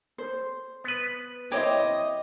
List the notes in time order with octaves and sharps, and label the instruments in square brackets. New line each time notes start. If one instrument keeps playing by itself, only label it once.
[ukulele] C5
[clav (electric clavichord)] B3 B4
[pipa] C4 E4 G4 [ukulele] C#5 E5 [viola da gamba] D#5